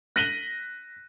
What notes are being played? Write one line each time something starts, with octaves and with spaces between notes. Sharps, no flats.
F#6 A#6 B6 D#7 F#7 G7